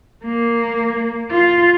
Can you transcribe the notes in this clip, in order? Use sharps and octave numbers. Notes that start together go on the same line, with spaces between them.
A#3
F4